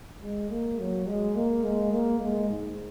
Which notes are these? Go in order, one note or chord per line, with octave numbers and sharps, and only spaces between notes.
G#3
A#3
F#3
G#3
A#3
G#3
A#3
G#3
G#2